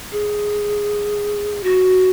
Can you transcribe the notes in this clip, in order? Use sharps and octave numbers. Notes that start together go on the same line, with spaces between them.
G#4
F#4